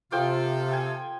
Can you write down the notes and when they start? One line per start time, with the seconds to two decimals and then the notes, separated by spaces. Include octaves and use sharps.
0.12 C3 F3 F4 A4 G5 D6
0.71 G5 G#5